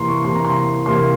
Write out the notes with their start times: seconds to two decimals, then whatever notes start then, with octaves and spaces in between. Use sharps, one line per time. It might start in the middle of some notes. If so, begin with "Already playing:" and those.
Already playing: C3 E3 A#3 A#5 C6
0.08 C#6
0.24 C3 E3 A#3 C6
0.35 A#5
0.45 C6
0.86 C3 E3 A#3 C6